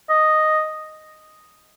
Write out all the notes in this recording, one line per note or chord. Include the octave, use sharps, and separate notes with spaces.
D#5